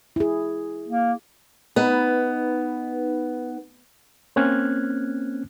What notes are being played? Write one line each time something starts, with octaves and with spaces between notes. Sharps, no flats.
E4 G#4
A#3
B3 D#4 B4
A#3 C4 C#4 F6 F#6 G#6